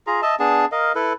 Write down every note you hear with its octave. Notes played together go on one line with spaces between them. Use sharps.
F4 G#4 A#5
D#5 E5 A5
B3 D4 G#4 A5
A#4 D#5 F5
E4 A4 B4